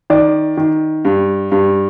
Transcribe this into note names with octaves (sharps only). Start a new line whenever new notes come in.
D#3 D5
D#3
G2
G2